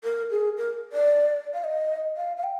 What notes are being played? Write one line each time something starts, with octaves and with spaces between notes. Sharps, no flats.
A#4
G#4
A#4
D5
F5
D#5
F5
F5
G5